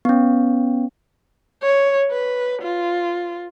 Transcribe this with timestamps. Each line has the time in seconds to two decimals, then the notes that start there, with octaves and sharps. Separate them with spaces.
0.05 B3 C#4
1.62 C#5
2.11 B4
2.62 F4